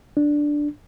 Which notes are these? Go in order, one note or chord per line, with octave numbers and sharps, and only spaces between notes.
D4